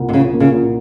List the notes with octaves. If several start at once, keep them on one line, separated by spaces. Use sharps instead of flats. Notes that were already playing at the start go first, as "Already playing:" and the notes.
Already playing: C2 A#2 A#3
C3
C#3 F3
A#3
C#3
A#2